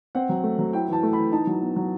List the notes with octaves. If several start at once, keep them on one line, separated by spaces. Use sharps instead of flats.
C4 F#5
F#3
A3
F#3
E4 G5
E3 A5
A3
E3 B5
D#4 A5
F#3
B3
F#3